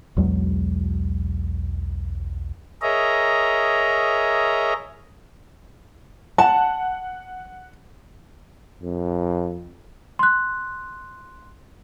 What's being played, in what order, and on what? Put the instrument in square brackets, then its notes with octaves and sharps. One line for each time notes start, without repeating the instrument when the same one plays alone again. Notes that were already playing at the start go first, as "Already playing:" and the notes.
[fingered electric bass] B1 E2 F#3 G#3
[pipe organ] G#4 A#4 C#5 D#5 E5 A#5
[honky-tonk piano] F#5 [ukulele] A5
[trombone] F2
[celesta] C6 F#6